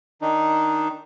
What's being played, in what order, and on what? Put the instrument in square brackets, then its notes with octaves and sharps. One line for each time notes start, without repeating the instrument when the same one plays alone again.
[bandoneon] D#3 D4 D#4